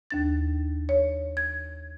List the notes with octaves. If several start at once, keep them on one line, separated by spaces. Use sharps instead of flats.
D#2 D4 A6
C#5
G#6